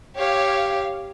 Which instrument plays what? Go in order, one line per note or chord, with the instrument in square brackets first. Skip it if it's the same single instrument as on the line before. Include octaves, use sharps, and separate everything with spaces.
[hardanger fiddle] G4 [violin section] C#5 F5